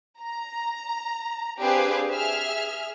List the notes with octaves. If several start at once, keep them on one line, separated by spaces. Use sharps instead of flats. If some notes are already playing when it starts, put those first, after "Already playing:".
A#5
C4 D4 G4 G#4 B4 F5
G#4 E5 F6